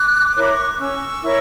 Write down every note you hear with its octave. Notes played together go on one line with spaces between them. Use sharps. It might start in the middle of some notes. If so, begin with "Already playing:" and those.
Already playing: D6 F#6
E4 A#4 C#5 B5
C#6
D6
C#4 C#6 E6
E4 A#4 C#5